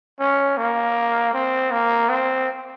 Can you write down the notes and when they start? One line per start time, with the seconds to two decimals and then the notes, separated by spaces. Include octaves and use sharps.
0.20 C#4
0.57 A#3
1.33 C4
1.71 A#3
2.09 C4